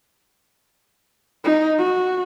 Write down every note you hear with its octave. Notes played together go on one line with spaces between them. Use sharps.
D#4
F#4